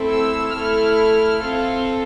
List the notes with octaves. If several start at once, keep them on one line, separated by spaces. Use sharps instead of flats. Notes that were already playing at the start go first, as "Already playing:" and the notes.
Already playing: A3 C4 E4 A4
E6
A3 E4 A4 F6
C4 F4 A4